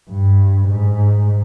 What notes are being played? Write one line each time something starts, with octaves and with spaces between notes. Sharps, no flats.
G2
G#2